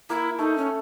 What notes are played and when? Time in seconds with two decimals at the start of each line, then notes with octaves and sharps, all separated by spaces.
0.10 A#3 E4
0.38 A3 D#4
0.58 C#4